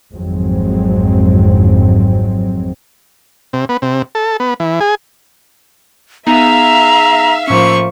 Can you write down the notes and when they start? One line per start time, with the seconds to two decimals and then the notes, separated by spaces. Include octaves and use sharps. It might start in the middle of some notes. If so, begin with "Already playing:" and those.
0.14 G#1 F2 G#2 F#3 G#3 C4
3.53 C3
3.69 B3
3.82 C3
4.15 A4
4.40 B3
4.60 E3
4.81 G#4
6.27 B3 D#4 G#4 E5 F5 A#5
7.48 A2 F3 A#3 C#4 C#6